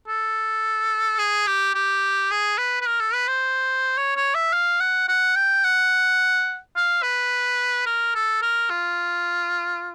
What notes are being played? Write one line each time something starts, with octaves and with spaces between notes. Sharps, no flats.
A4
G#4
G4
G4
G#4
B4
B4
A#4
A4
B4
C5
C#5
C#5
E5
F5
F#5
F#5
G5
F#5
F5
B4
A#4
A4
A#4
F4